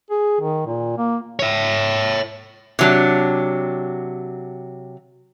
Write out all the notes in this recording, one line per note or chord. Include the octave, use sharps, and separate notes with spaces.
G#4
D#3
A#2
A#3
C#5 E5
C3 F#3 D4